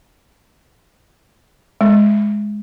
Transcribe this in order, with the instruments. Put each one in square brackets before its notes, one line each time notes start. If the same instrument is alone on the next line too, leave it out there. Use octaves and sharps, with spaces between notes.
[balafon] G#3